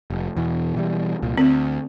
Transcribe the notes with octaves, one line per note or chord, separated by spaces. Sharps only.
F1
E2 B2 E3
B2 E3 G3
C2 A#2
D2 C4